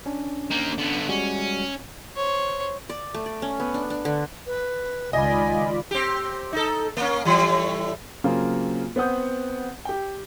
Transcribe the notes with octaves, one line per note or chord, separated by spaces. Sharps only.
C#4 D4
A#3 D#4
D3 B3
G3 G#3 C#4 F#4
C5 C#5
D5
A3
D5
C#4
B3
D4
D4
D3
B4
C#2 D#3 F4 D5 D#5 G#5 B5
C4 G4
D#4 A4
A#3 C#4
A2 E3 G3
C#3 F#3 A#3 C4 F4 G#4
B3 C4 F#5 D#6 G6
G4 G5